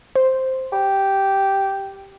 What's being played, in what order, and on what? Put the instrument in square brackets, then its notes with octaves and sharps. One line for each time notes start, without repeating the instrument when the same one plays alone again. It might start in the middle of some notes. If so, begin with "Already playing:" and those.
[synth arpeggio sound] C5
[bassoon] G4